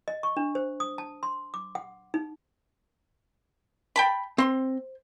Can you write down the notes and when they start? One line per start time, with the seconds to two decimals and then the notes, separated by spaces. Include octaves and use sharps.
0.08 D#5
0.23 C#6
0.37 D4
0.55 C5
0.80 D#6
0.98 A5
1.23 C6
1.54 D6
1.75 F#5
2.14 D#4
3.96 G5 A5 B5
4.38 C4 C5 C6